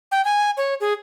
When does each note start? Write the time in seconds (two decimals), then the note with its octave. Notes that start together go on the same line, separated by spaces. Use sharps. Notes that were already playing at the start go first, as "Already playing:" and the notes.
0.11 G5
0.25 G#5
0.57 C#5
0.80 G#4